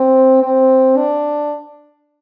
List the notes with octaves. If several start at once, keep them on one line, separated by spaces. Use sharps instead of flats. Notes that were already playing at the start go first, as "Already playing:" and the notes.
Already playing: C4
C4
D4